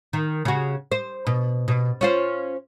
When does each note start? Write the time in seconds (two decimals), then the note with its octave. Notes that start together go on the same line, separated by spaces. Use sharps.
0.13 D#3
0.45 C#3 F#4
0.92 C5
1.27 B2
1.68 B2
2.01 C#4 F4 C5